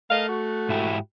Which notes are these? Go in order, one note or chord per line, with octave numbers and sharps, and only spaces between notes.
A3 A#4 D#5 F5
F#4
G#2 E4 G4